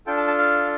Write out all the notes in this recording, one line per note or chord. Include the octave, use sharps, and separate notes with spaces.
D4 F4 A4 G5
A5
A5
F5